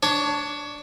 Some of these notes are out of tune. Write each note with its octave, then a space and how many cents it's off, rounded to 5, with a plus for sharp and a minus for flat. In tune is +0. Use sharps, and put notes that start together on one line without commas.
D4 +0 C#5 +20